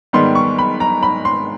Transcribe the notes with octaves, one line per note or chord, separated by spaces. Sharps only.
G#2 D#3 G3 B3 C6
C#6
B5
A#5
B5
C6